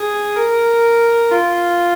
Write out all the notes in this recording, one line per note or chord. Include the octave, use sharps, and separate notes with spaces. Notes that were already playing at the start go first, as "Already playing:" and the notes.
Already playing: G#4
A#4
F4